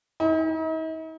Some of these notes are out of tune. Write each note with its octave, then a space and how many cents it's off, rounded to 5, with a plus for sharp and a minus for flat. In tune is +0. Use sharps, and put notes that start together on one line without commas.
D#4 +45